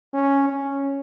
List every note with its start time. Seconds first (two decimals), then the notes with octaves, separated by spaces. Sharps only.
0.14 C#4
0.49 C#4